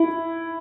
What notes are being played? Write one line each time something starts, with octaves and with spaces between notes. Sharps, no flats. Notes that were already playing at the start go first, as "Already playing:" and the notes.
Already playing: E4